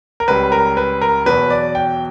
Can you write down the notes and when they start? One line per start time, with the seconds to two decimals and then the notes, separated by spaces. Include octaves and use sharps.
0.20 A#4
0.28 C#2 C#3 G3 B4
0.52 A#4
0.77 B4
1.01 A#4
1.26 E2 B2 F#3 B4
1.50 D5
1.75 G5